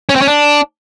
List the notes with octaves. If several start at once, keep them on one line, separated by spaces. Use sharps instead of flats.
C#4
C4
C#4
D4